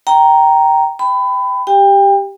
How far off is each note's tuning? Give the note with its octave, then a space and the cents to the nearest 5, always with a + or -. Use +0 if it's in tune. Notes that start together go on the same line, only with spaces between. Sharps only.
G5 -10 A#5 +0
G5 +0 B5 +25
G4 +0 G5 +30